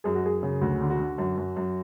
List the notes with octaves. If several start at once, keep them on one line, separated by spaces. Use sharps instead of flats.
F#2 G#4
F#4
F#2 G#4
C#3
D2 F#4
D3
F#4
D3
F#2
F#2
F#2